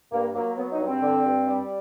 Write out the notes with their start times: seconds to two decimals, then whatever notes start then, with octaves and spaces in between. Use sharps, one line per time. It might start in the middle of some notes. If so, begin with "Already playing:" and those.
0.12 G2 A#3
0.35 F#3 A#3
0.56 F#3 B3
0.72 D#4
0.79 G2
0.87 C4
1.02 D3
1.25 G2
1.47 G3